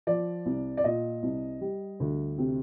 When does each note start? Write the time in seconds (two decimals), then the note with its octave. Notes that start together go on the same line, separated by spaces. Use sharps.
0.07 F3 D5
0.46 C2
0.77 D5
0.84 A#2 D#5
1.23 C2
1.61 G3
2.00 D2
2.38 C3